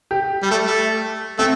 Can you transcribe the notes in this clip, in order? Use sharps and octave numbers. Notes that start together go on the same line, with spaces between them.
G4
G3
A3
A3
A3 C4